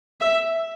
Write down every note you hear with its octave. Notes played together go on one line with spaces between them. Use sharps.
E5